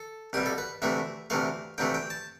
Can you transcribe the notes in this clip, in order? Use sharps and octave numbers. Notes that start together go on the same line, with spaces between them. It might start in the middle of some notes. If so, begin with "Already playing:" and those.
Already playing: A4
C2 B2 G3 G4
A4
B4
D2 C3 E3 A3 E5
D2 C3 E3 A3 F5
D2 C3 E3 A3 G5
G5
A5